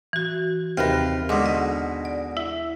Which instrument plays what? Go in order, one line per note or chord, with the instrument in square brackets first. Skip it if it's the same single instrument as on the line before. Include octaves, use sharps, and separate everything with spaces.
[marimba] E3 F#4
[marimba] D#2 A#6 [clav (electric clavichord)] C3 D#3 B4 [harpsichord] F4
[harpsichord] G#2 B2 [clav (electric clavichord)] D3 G#3 [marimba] C6 D6 F6
[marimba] D#5
D5
[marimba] E4 [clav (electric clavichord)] E5